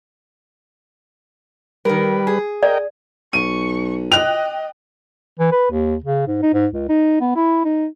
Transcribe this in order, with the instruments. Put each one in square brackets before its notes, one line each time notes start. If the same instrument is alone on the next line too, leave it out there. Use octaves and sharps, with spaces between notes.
[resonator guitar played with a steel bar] D#3 A#4 [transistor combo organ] G3 B4
[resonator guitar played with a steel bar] G#4
[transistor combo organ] A#4 D#5 G5 [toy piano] D5
[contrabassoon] B1 [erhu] C#6 [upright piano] D#7
[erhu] D#5 [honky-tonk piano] G5 F#6 [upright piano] F7
[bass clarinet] E3
B4
D#2
C#3
G#2
D#4
G#2
C#2
D#4
B3
E4
D#4